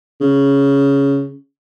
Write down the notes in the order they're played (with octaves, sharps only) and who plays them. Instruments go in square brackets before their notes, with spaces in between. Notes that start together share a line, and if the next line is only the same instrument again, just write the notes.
[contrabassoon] C#3